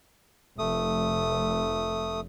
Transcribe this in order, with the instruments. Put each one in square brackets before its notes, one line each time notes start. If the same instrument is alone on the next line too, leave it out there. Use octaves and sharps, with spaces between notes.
[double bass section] F1 [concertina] A3 D#6